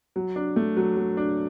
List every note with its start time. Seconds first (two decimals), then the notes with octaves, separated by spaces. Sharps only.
0.16 F#3
0.36 D4
0.56 A3
0.77 F#3
0.97 F#3
1.17 D4